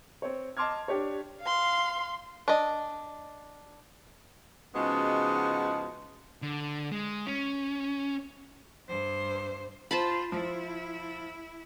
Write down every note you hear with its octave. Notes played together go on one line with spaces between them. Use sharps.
C4 C#5
D#5 A5 C6 D6 F6 G#6
D4 G4 C#5
F5 C6
D4 D#5
C#3 F3 G#3 B3 D#4 F#4
D3
G#3
C#4
G2 C5
F4 C5 A5 B5
F3 E4